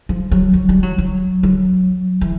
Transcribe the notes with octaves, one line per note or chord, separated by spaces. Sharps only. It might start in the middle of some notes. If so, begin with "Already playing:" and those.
F3
F#3
F#3
G3
F#3
F#3
F#3
E3